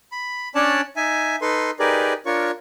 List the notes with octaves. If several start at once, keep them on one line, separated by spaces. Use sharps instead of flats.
B5
C#4 D4 C#5 D5 A5
D#4 E5 G#5
D#4 A4 B4 C6
D#4 G4 G#4 A#4 B4 D5
D4 F4 A#4 C#5 C#6